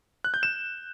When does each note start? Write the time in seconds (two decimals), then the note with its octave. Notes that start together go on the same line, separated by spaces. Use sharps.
0.24 F#6
0.34 G6
0.43 E7